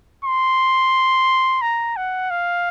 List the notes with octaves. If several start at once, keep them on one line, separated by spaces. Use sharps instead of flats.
C6
A#5
F#5
F5